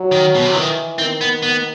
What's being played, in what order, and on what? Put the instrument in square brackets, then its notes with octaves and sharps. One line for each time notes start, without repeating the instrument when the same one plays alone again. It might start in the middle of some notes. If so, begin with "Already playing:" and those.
Already playing: [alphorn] F#3
[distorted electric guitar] D#3
B2
C3
[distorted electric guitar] D#3 [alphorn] E3
[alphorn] D#3 [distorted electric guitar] C4
[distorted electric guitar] B3
B3